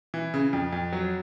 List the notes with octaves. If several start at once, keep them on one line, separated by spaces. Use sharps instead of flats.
E3
C#3
F2
F2
F#3